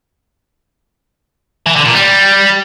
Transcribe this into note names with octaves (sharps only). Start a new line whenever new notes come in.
E3
D3
A#2
G3